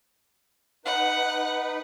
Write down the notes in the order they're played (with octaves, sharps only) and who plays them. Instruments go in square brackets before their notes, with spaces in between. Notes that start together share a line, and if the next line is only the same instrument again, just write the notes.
[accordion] D#4 B4 [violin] F#5